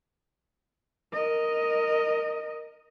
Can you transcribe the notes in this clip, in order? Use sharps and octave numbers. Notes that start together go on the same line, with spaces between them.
A#4 D#5